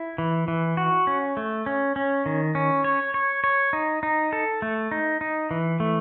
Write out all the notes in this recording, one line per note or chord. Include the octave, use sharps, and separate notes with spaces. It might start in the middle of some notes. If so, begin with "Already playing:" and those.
Already playing: E4
E3
E3
F#4
C#4
A3
C#4
C#4
D#3
C#4
C#5
C#5
C#5
D#4
D#4
A4
A3
D#4
D#4
E3
A3